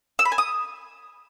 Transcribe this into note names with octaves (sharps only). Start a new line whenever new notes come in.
E6
B5
G#5
D#6